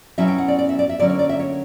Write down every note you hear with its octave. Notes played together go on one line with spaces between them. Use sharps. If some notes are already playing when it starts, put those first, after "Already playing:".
B2 F#3 C#4 E4 E5
G5
F#5
D5
D5
E5
D5
E5
D3 F#3 A#3 C#4 D5
C#5
D5
E5
C#5